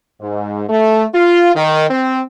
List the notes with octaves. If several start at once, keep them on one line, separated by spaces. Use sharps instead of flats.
G#2
A3
F4
D#3
C4